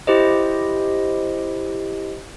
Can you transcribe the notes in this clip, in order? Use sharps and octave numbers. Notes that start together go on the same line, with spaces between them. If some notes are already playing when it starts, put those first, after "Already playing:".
E4 G4 C5 D#5